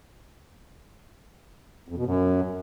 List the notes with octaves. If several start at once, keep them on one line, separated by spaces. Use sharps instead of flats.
F2
B2
F#2